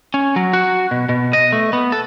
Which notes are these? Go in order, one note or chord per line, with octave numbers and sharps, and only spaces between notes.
C#4
F#3
F#4
B2
B2
D#5
A3
B3
A4